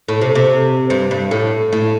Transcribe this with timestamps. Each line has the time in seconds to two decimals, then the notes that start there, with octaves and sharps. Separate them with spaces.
0.08 A2
0.21 C3
0.35 C3
0.90 G2
1.11 G2
1.31 A2
1.72 A2